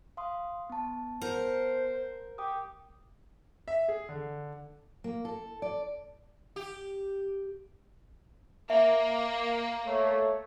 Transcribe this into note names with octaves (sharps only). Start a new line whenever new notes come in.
F5 C6 D#6
B3 A5
A#4 C5 F#5
G4 G5 D6 D#6
E5
G#4
D3
A#3
A4
D5
G4
A#3 E5
A3 C#5